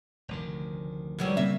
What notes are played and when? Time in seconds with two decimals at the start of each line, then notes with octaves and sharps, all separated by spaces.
0.28 F1 D2 D#3
1.19 B2 F#3 G3
1.37 C#3 A#3 C4 E5